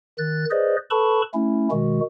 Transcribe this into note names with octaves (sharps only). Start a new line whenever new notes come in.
D#3 F#6 A6
G#4 B4 C5 D5 D#5
A4 B4 A5 B5 C#6
A3 C#4 E4
B2 D#3 G#3 F#4